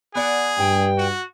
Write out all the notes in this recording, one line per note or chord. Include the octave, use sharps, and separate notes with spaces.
B3 G#4 D5 F#5
G2 G5
F#4